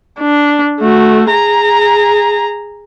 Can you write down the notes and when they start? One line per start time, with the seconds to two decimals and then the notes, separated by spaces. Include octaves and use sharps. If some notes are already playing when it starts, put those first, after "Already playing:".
0.21 D4
0.80 A3 F#4
1.30 G#4 A#5